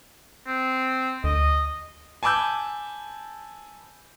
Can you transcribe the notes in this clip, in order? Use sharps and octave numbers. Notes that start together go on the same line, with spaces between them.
C4
D2 D#5
G#5 A5 B5 D6 E6 G6